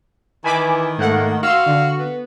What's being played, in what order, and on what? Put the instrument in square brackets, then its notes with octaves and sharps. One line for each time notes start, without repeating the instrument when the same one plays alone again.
[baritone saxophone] D#3 [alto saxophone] E3 [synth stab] G#5 B5 D6
[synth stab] G#2 A3 F#5 [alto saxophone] A#3
[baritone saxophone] F#4 [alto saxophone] F5 [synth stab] C6 E6
[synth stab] D3
[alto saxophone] B3